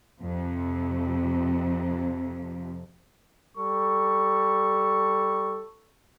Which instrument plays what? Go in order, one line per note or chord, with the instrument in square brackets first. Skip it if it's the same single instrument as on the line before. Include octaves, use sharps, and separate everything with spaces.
[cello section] F2 C3
[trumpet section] G3 A4 C#6